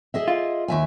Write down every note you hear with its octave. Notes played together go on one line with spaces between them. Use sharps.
G#4 D#5 E5
F4
D#2 E5 G#5